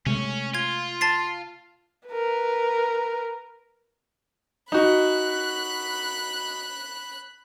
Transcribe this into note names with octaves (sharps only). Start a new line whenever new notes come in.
C3 G#3 A3 C#4
F4 G#6
A5 A6 C7
A#4 B4
D#4 F#4 B5 F#6